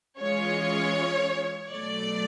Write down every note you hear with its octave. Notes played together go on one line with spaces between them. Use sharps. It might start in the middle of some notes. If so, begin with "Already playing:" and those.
E3 G#3 C#4 F4 C#5
B2 F#3 A3 D5